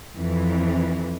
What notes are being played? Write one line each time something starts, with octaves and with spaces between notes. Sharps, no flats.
F2 E3